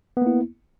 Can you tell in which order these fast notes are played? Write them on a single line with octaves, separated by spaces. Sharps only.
B3 A#3 E4